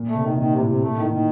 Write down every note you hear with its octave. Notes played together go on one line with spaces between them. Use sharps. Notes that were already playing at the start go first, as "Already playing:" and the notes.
Already playing: A#2
A3
C3
D#3
C3
A#2 D#3
C3
A2
C3
A#2 A3
A2 D#3
A#2 D#3